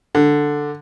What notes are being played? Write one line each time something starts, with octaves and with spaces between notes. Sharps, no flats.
D3